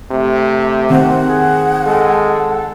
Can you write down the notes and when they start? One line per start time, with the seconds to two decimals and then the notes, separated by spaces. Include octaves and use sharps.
0.11 C3 A3
0.90 D#3 C4 F#5
1.27 G#4
1.87 G#3 A4